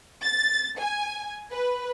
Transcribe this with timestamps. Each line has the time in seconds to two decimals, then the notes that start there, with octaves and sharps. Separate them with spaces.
0.22 A6
0.79 G#5
1.52 B4